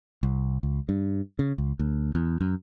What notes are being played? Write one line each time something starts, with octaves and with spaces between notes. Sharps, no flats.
C2
C#2
G2
C#3
C#2
D2
E2
F#2